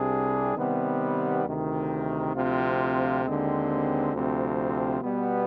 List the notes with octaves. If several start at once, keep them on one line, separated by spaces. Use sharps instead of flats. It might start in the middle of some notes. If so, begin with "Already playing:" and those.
Already playing: C2 C3 G3 D4 G#4
C3 D#3 G3 B3
D2 C3 D#3
D2 C3 F3 C4 F4
D#2 D3 G#3 C4
D2 C3 F3 C4
B2 G3 B3